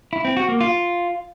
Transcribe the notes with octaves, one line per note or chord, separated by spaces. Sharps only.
E4
C4
F#4
A#3
F4